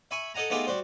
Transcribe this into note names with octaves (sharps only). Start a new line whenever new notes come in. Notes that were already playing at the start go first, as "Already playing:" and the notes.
E5 G#5 B5 C#6
A4 D#5 F#5 G#5 A#5
A3 B3 D#4 F4 G4 G#4
G3 F#4 C5